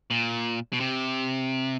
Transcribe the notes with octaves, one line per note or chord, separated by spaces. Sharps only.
A#2
B2
C3